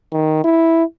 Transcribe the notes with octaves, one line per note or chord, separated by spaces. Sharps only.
D#3
E4